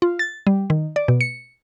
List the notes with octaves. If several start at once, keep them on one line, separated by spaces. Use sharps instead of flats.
F4
A6
G3
D#3
D5
B2
C#7